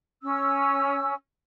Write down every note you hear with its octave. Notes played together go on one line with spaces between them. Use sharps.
C#4 E6